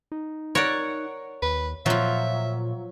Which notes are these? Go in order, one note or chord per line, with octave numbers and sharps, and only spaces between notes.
D#4
A#4 C#5 D5 F#5
D#2 B4
A#2 F3 F#3 F4 E5